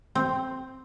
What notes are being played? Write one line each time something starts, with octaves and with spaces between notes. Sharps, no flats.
C4